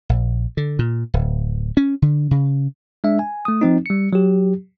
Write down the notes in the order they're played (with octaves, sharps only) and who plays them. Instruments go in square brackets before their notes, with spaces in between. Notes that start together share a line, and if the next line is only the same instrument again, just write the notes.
[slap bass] A#1
D3
A#2
D1
C#4
D3
C#3
[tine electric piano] G#3 D4 E5
G#5
A3 D#6
F3 C4 D#4
G3 C#7
F#3 G4